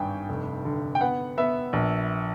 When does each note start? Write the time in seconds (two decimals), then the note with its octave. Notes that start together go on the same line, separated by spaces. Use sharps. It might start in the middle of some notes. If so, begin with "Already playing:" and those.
Already playing: G#1 G2 G5 G#5
0.29 F1
0.65 D3
0.95 G5
1.01 B3 F#5
1.38 B3 E5
1.73 A#1